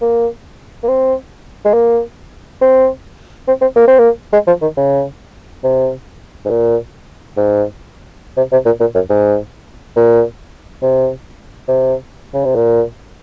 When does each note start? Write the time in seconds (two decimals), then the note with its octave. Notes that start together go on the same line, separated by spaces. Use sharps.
0.01 A#3
0.83 A#3
0.88 C4
1.65 G#3
1.74 A#3
2.61 C4
3.48 C4
3.61 C4
3.76 A#3
3.87 C4
3.99 A#3
4.33 G#3
4.47 F3
4.62 D#3
4.77 C#3
5.64 C3
6.45 G#2
6.50 A#2
7.37 G#2
8.37 C3
8.52 C3
8.66 A#2
8.80 A#2
8.95 F#2
9.10 G#2
9.96 A#2
10.82 C3
11.68 C3
12.34 C#3
12.45 C3
12.56 A#2